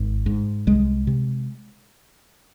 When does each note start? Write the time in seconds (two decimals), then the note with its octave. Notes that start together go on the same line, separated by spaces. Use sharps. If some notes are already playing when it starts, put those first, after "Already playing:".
Already playing: G#1
0.26 G#2
0.67 C2 G#3
1.07 C3